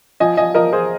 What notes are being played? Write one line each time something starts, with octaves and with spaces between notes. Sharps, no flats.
F3 D#5 G#5
F3 D#5 G#5
F3 A#4 D#5
F3 G#4 C5